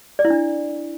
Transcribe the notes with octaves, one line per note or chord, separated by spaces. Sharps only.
D5
E4
D4